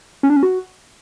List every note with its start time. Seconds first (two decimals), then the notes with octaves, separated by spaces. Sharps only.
0.23 C#4
0.30 D4
0.36 C#4
0.43 F#4